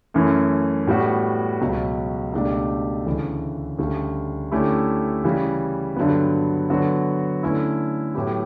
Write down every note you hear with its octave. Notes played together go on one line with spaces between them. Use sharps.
F#2 E3 A3 C#4
A2 G3 B3 F#4
C#2 B2 F#3
C#2 B2 A3 D4 G4
D2 C#3 E3
D2 C#3 G3
D3 A3 C#4 E4 G4
C#3 E3 G3
G2 D3 F#3 B3
D3 F#3 B3 F#4
D3 A3 C#4 E4
A2 F#3 B3 E4 G4